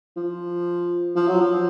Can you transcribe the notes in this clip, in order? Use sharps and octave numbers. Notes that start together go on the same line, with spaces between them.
F3
F3
F#3
F3